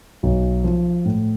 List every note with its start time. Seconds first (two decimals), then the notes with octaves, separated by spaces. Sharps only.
0.23 B1
0.64 F3
1.05 A2